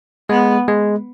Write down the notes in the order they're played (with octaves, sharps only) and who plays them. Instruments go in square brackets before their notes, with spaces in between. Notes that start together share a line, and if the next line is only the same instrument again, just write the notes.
[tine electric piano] G#3 [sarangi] B3
[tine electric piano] G#3